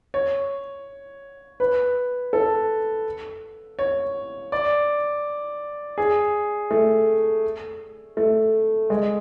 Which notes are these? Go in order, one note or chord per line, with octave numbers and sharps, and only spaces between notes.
C#5
B4
A4
C#5
D5
G#4
A3
A3
G#3